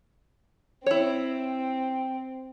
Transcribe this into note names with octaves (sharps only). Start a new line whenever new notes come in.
C4 E4 C#5